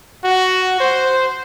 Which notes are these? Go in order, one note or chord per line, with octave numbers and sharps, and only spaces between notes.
F#4
C5